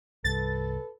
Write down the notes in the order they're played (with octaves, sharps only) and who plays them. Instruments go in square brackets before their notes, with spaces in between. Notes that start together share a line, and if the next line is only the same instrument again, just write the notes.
[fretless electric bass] C2 G2 [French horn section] A4 B4 [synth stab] A6